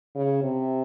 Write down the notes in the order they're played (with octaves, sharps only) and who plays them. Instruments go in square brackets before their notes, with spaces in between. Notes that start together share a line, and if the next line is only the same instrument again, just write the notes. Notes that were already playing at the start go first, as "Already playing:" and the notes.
[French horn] C#3
C3